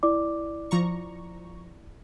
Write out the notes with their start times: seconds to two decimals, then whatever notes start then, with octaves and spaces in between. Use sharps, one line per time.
0.03 E4 D5 D6
0.71 F3 A#5 C#6